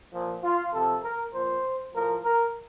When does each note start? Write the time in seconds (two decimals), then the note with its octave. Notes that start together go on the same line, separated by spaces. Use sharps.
0.12 A#2 F3
0.42 F4
0.72 C3 F3 A4
1.03 A#4
1.33 A#2 F3 C5
1.94 A2 F3 A#4
2.24 A#4